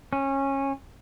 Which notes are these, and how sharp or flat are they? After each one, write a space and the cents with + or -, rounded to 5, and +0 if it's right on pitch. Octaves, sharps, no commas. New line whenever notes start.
C#4 -20